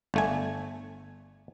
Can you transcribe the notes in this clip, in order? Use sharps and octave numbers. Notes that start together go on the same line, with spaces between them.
G1 A3 G#5